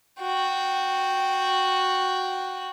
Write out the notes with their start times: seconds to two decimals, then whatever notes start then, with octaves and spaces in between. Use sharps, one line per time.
0.20 F#4 G5